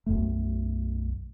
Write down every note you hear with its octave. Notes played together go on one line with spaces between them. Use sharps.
B1 F#2 A3